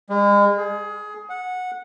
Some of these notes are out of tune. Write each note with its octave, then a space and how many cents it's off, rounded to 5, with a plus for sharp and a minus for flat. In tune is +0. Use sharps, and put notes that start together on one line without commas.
G#3 -40
G#4 +20
F#5 -15